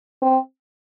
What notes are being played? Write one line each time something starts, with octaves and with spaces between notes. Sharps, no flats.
C4